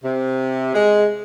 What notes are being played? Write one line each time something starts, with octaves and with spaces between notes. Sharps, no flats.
C3
G#3